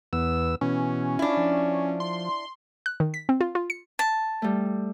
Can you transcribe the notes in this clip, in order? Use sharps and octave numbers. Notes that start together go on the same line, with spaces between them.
E2 B3 E6
B2 E3 C#4
D4 E4 F4
F3
C6
F#6
D#3
B6
C4
F4
F4
C#7
A5
G3 A3